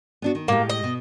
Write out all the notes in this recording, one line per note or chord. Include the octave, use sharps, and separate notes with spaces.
B3 D4 F#4
D#3
A2 G#3 A#3 G4
D#5
B2